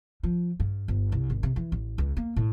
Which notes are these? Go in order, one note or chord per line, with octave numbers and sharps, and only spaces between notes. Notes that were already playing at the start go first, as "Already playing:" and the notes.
F3
G2
G1
C2
G#1
C3
E3
A1
C#2
A#3
A2